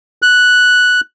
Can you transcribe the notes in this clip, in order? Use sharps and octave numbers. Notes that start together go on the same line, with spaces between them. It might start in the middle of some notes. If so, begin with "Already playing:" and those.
F#6